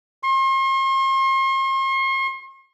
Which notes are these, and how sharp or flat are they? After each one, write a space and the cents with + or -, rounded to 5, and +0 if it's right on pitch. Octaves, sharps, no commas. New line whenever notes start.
C6 +45